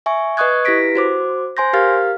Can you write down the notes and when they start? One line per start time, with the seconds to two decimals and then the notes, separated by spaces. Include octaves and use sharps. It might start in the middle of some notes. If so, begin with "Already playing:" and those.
0.06 E5 G#5 C#6
0.37 B4 D#5 C#6 D#6 F#6 G#6
0.65 E4 G4 B4 A#6 B6 D7
0.95 F#4 C5 D6
1.57 C5 G#5 C6 G6 A#6
1.73 G4 A#4 F5 F6 A6